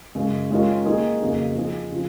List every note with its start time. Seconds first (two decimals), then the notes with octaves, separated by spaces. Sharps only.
0.15 F#2 C#3 G#3
0.50 D#3 G#3 C#4 F4 A#4
0.85 D#3 A#3 D#4 G#4
1.21 F2 C#3 F#3 A#3 D#4
1.55 F3 C4 D#4 G#4
1.92 C#3 F3